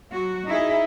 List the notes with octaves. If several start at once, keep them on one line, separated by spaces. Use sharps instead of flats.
F#3 F#4
D#4 E4 G#4